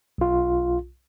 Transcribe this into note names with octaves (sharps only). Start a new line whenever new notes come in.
B1 F4